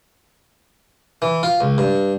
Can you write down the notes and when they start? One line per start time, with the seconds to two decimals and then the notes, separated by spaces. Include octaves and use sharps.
1.22 E3
1.43 F4
1.61 C#2
1.78 G2